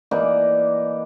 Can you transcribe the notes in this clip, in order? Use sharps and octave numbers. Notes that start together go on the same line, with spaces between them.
E3 A#3 D#4 D5